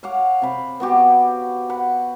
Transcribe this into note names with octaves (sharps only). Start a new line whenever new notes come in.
C#5 F5 F#5 D6
C3 B5
B3 F#4 G4
F#5 B5